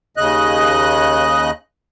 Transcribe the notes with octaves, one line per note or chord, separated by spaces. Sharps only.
D#2 C#3 D#5 F#6